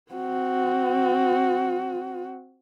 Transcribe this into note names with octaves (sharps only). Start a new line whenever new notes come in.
C4 F#4